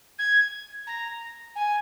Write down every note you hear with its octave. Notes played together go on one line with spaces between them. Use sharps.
G#6
A#5
G#5